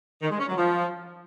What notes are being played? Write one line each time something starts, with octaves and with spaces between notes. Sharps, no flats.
D#3
G#3
C#4
F#3
F3